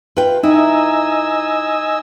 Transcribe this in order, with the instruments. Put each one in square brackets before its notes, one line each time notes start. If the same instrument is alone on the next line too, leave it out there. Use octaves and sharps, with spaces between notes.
[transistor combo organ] F4 [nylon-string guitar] B4 G5
[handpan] D#4 [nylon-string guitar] E4 [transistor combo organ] D#5 G#5 E6